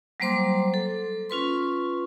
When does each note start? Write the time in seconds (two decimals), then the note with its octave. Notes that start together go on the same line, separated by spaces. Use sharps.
0.20 F#3 G3 A#3 C5 C6 D6
0.74 A4
1.30 C#4 F4 B4 C6